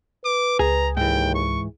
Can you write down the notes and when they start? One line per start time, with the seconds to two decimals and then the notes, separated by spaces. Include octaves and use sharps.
0.25 B4 D6
0.59 C#2 G#4 A#5
0.97 D#2 G#2 E3 G5
1.34 C#6